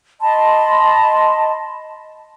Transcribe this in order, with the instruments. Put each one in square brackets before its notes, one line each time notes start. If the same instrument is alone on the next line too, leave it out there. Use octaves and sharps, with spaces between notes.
[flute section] D#5 A5 B5 C6